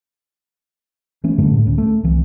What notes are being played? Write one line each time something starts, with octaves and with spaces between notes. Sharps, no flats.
E3 A3 C#4
G2 D3 G#3 A3
A2
D2 C#4
A3
C2 E3